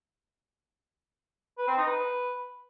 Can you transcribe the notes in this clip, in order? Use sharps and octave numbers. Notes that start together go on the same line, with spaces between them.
B4
C4
D#4
B4